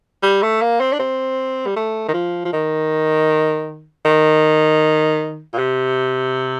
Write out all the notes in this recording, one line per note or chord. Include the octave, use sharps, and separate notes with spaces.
G3
A3
A#3
C4
D4
C4
G3
A3
D#3
F3
F3
D#3
D#3
A#2
C3